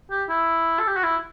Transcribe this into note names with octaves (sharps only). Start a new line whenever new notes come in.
G4
E4
A4
G4
F#4
E4